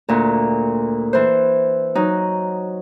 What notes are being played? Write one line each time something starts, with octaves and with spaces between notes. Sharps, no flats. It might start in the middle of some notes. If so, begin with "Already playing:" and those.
D2 A#2
E3 C5
F#3 D#4